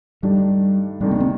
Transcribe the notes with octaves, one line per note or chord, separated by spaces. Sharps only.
G2 D#3 G3 A3 D4
D2 C3 D#3 G3 A3 D4
A#3
C4